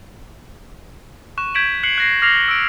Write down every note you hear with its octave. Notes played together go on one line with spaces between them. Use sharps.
C#6 F#6 E7
G6 G#6 B6 D7 E7 F#7
F#6 C7 C#7 F#7
F#6 A#6 C7
D6 F6 A#6 C7 F7
E6 D7